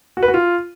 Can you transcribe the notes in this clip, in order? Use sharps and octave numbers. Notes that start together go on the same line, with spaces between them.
F#4
B4
F#4
F4